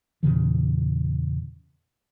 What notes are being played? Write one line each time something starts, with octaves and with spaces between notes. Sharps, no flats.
E2 A#2 C#3 E3